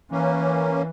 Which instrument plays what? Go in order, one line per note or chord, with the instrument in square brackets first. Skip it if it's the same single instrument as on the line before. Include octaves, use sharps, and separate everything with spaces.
[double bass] E3 [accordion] A#3 C#4